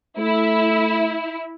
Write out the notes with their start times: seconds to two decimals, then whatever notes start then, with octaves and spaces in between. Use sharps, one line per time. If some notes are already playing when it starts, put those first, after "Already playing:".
0.18 A3 E4